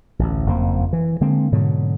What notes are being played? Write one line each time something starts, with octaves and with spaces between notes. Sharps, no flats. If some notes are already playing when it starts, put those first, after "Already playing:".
A1 D2
F#1 F2 F3 A#3
E3
D3 G#3 A#3 C4
G#2 B2 D3 F#3